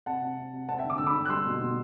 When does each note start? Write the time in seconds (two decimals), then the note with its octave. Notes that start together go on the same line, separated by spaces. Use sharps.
0.06 C3 F#5 A5
0.22 C3
0.37 C3
0.53 C3
0.68 C4 F#5 A5
0.78 E5 G5
0.84 D3
0.90 D6
0.98 D3 E6
1.06 B5 D6
1.15 D3
1.25 F#6
1.30 G3 C6 E6
1.46 B2
1.60 B2